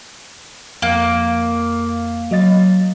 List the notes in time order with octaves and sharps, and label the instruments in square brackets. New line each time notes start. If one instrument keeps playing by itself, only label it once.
[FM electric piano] F2 [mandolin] A#3
[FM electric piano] F#3 D#5 A6